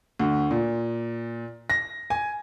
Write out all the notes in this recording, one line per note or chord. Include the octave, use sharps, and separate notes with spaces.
D2
A#2
A#6
G#5